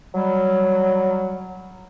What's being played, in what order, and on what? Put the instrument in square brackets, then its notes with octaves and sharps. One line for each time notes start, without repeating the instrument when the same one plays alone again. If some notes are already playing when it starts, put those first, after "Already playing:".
[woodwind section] F#3 G3